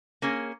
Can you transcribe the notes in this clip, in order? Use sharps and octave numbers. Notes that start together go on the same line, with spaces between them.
A#3 C#4 G#4